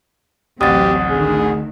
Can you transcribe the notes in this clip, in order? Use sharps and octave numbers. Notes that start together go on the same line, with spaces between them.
A1 D2 F#3 C4 G4 D#6 A6
D3 D#3 A3 G#4